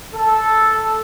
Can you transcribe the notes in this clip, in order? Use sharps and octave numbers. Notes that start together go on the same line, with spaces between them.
A4